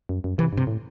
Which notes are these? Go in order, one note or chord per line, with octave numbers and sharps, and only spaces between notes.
F#2
F#2
C3 E3
G2 C3
A2